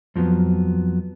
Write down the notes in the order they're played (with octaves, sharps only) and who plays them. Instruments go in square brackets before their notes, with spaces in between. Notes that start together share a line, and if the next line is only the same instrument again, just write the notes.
[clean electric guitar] F2 F3 F#3 B3